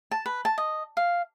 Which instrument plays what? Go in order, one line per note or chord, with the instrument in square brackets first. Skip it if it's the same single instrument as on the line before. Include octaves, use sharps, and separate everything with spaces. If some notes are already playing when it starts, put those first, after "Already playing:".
[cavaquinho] A5
B4
A5
D#5
F5